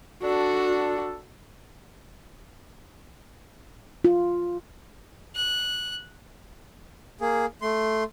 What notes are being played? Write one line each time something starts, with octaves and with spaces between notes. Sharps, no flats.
D4 F#4 A4
F4
F#6
A#3 G#4
A3 C6